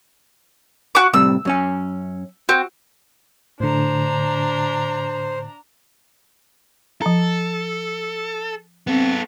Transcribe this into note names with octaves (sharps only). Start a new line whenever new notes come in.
F#4 D6
A2 C3 G3 E6
F#2 C#4 G#5
C4 F#4
A2 D3 D4 C5 A#5
F3 A4 A#5
B3 C4 A4